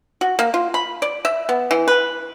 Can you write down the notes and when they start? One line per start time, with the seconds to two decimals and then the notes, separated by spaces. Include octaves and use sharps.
0.21 F#4
0.39 A#3
0.54 F4
0.74 B5
1.02 D5
1.25 E5
1.49 B3
1.71 E3
1.88 B4